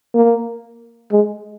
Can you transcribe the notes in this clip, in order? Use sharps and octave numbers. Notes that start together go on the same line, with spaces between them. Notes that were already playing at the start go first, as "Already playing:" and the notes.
A#3
G#3